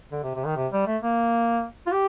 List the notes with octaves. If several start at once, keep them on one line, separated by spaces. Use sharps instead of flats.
D3
C3
C3
D#3
C3
G3
A3
A#3
F4
G4